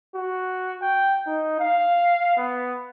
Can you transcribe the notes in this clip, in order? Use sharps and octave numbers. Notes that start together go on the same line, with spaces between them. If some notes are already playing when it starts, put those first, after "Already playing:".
F#4
G5
D#4
F5
B3